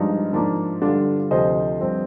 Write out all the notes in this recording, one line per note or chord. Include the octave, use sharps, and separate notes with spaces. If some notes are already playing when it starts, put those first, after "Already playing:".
Already playing: G2 F3 G#3 D4 D#4
G#2 F3 A#3 D4
G2 D3 G3 D4 F4
D2 C3 F3 C5 D#5
G2 F3 C4